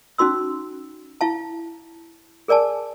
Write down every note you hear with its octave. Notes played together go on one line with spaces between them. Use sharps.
C#4 D#4 F#4 C6 E6
E4 F5 A5
G#4 A#4 D5 G#5 A5